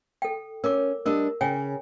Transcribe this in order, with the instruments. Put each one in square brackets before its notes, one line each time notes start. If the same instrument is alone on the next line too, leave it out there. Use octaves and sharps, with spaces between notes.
[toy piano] A4 G5
[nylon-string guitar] C#4 [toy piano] A#4 D6
[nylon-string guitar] G3 D4 D#5 [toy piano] A#4
[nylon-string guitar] C#3 [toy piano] C#5 G5 G#5